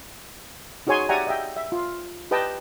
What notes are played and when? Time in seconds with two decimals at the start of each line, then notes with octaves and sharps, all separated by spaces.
0.87 D#4 F#4 G#4 C#5 G#5 C6
1.09 G4 D5 E5 F#5 G#5 A#5
1.27 D#5 E5 G5
1.57 E5
1.72 F4
2.31 G4 B4 D#5 G5 A5